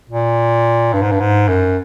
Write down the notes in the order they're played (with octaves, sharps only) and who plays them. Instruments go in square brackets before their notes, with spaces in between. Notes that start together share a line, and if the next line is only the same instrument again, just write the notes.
[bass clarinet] A#2
G2
G#2
G2
G#2
F#2